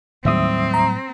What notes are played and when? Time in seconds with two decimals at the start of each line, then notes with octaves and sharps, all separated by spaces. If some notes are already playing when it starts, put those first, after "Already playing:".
0.25 D#2 A2 F#3 G3 C4 E5 D#6
0.74 A#5